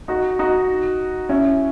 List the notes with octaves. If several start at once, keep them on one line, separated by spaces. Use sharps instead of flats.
D#4 F#4
D#4 F#4
C#4 E4